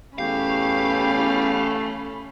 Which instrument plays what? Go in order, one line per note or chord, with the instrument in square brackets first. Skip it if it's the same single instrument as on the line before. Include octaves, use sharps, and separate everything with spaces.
[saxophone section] E2 G4 [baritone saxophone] A3 [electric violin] C#4 B5 [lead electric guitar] F5